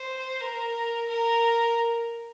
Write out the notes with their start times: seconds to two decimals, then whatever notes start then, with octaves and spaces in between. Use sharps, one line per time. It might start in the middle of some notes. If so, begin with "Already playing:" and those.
Already playing: C5
0.41 A#4
1.08 A#4